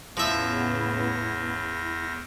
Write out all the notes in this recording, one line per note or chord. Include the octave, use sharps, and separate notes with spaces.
E2 A2 C#3 F3 B3 E4 E5 A#6